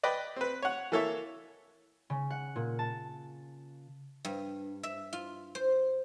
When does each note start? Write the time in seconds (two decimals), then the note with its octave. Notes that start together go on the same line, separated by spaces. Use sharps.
0.03 B4 D5 D#5 G5 B5
0.36 C4 B4
0.62 C#5 F#5
0.92 E3 A#3 A4 C#5 E5
2.10 C#3
2.30 F#5
2.56 A#2
2.79 A5
4.25 G2
4.83 E5
5.13 F4
5.55 C5